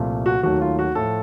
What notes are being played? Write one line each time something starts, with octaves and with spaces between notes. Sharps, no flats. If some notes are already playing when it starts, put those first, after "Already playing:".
Already playing: C2 A#2 F3 A3
F#4
D#2 D#3 F#3 A3 F#4
F4
F#4
A2 F3 A3 A4